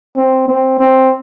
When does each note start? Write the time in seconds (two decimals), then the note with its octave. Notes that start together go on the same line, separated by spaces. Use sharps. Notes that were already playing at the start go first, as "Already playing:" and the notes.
0.16 C4
0.48 C4
0.79 C4